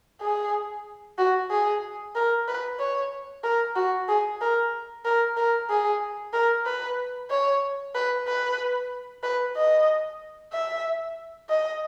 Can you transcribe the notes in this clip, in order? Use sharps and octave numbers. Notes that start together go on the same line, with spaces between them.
G#4
F#4
G#4
A#4
B4
C#5
A#4
F#4
G#4
A#4
A#4
A#4
G#4
A#4
B4
C#5
B4
B4
B4
D#5
E5
D#5